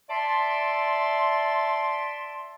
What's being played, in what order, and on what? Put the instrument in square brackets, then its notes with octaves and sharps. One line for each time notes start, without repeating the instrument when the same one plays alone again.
[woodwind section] D5 E5 A5 C6